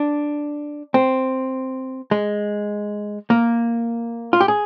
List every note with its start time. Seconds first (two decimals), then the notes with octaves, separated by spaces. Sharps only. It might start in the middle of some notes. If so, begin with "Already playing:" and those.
Already playing: D4
0.94 C4
2.11 G#3
3.30 A#3
4.33 F4
4.40 G4
4.48 G#4